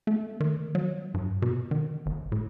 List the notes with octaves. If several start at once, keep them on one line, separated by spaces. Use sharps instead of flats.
A3
D#3
F#3
G2
B2
D#3
G1
A2